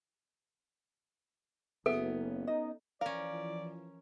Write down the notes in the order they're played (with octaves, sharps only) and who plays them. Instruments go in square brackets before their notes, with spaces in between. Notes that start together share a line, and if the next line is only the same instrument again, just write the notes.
[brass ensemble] F#1 [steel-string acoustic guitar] B3 C#4 [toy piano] A4 [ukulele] E5
[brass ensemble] D#4 [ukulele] D#5
[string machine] E3 F3 [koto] C#4 A#4 [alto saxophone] D5 [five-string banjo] F5